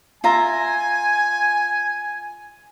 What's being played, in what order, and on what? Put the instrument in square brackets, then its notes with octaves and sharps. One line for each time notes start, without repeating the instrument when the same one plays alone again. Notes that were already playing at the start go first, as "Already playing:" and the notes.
[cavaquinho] F4 E5 A#5 [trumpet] G#5